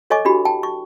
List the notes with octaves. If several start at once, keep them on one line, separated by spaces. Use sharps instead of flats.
A4 C#5 D#5 G#5 C#6 D6
D4 E4 F#4 G4 B5
G5 A5
C#6